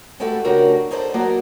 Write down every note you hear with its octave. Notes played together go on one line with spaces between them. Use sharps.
G#3 A3 E4 F#4 G4 A4
C#3 A3 D4 F#4 G4 A#4
D#4 G#4 A4 C5 D5
E3 F#3 A#3 F#4 D5 D#5